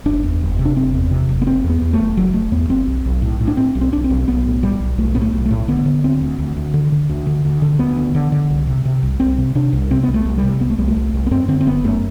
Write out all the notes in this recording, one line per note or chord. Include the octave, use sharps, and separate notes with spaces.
F#1 D4
E2
F#1
C3
D4
F#1 C4
E2
C3
F#1
B3
F#1 C4
E2
B3
E2
A3
F#1
F#1 F#3
F#1 A3
E2 B3
F#1 C4
B1
B1
A2
A2
D4
A2 C4
B1
C4
B1 D4
C4
B1
B1 B3
A2
A2 G3
B1
B1 A3
A2 B3
A3
B1
A3
A2
D3 B3
D3
D2 C4
D2
D2
D2
D3
D3
D2
D3
D2
D3
D2 B3
D3
D3
D3
C2
C3
C3
C2
C2 C4
C3
C3 D4
C2
C3 C4
C2 B3
A3
C2
G3
C3
C2 B3
A3
C2 G3
A3
C2
C2
B3
F#2 C4
D3 C4
C4
F#1 B3
F#2 A3